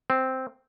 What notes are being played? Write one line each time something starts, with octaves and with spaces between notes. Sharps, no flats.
C4